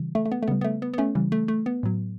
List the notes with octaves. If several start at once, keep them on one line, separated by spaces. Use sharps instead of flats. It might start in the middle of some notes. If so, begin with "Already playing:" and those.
Already playing: C#3 E3 G3
A3
A3
B3
A3
C#3 G3 B3
B3
A3
B3
B3
A3 C#4
C#3 E3 G3
A3
A3
B3
A2 F#3